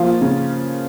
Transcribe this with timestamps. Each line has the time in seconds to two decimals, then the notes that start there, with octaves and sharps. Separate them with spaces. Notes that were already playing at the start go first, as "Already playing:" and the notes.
Already playing: F3 A#3 F4
0.21 C#3